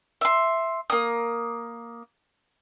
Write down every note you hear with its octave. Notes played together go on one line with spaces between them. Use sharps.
E5 C6
A#3 D#6